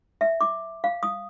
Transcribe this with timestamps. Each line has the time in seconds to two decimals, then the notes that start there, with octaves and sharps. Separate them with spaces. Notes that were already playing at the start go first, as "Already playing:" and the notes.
0.21 E5
0.41 D6
0.84 F5
1.03 D#6